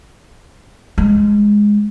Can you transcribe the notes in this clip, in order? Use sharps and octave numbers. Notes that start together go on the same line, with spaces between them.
G#3